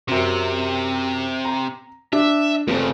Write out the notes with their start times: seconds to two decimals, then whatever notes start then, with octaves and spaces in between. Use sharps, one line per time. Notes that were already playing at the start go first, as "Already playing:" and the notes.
0.08 F#2 C3 C4
1.45 A#5
2.13 D4 E5
2.68 F1 F2 C#3 C4 A4